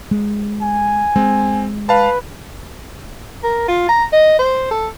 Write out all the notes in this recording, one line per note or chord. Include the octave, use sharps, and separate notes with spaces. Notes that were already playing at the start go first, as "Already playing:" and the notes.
G#3
G#5
G#3 C4
B4 F5 A5
A#4
F4
A#5
D#5
C5
A4